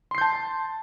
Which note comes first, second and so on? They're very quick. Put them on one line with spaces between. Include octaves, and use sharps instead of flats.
C6 C7 G6 A5